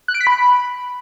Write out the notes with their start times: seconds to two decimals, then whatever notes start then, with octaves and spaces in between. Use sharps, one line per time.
0.08 F#6
0.14 D7
0.21 B6
0.27 B5